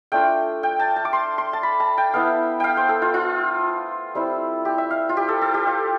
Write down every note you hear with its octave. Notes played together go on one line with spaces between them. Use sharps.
A3 D4 F4 G5
G5
A5
A5
D6
C6
C6
A5
B5
A5
G5
B3 E4 F5
F5 G5
C5
A4
F4
F4
G3 C4 E4
G4
E5
F5
F4
G4
A4
A4
G4
F4